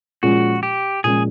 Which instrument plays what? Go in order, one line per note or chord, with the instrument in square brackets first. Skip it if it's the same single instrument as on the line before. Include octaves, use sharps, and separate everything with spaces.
[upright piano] A#2 F3 G#3 C#4 [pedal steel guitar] F#4
[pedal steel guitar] G4
[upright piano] A#2 F3 G#3 C#4 [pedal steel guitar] G#4